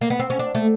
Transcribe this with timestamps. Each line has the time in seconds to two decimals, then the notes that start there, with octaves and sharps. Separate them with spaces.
0.01 A#3
0.10 B3
0.19 C4
0.30 C#4
0.39 D4
0.55 A3